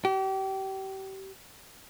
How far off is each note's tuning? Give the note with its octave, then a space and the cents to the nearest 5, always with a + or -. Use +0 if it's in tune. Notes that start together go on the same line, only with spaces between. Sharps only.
G4 -30